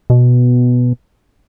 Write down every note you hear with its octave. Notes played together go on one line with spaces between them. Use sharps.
B2